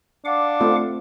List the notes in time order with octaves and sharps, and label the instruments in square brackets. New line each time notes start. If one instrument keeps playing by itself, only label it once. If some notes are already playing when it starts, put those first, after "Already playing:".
[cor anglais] D4 [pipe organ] F5 F#5 D6
[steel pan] A3 C4 F4